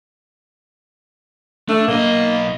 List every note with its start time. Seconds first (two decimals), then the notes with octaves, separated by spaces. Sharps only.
1.69 A3 D4
1.88 B1 A#3 D#5